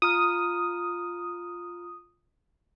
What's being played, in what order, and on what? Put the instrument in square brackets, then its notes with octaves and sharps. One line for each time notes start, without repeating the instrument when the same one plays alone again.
[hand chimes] F4 A#5 F6 [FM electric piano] D#6